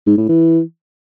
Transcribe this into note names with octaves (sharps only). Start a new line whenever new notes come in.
G#2
A2
E3